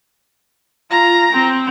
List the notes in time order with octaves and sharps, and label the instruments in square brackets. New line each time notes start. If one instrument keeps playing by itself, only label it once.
[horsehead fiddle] F4 [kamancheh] A#5
[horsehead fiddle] C4